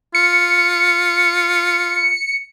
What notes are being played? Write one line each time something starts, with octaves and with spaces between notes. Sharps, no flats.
F4 C#7